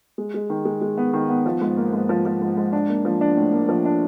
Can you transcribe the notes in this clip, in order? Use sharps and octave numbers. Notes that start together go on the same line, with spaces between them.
G#3
G#3
D#3
G#3
G#3
B3
D#3
B3
F3
G#2
A#3
G#2
F3
F3
G#2
G#2
D4
A#3
F3
D4
A2
A#3
F3
D4